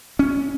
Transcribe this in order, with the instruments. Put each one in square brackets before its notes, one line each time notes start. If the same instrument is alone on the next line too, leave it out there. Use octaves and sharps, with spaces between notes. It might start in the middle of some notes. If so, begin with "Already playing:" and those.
[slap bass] C#4